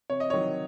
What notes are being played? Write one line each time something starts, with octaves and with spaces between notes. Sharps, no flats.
C3 C#5
D#5
D#3 F#3 C#5